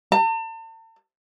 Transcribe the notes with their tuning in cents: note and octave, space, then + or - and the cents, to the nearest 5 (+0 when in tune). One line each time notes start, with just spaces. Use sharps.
A5 +40